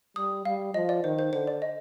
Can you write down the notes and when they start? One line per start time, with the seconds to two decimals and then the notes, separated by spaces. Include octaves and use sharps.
0.16 G3 D#6
0.45 G3 F5
0.74 F3 D#5
0.89 D5
1.04 D#3 C5
1.19 C5
1.33 D3 C5
1.47 D5
1.62 D#5